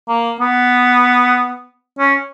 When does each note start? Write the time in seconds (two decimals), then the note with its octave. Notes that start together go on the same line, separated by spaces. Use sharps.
0.08 A#3
0.41 B3
1.99 C#4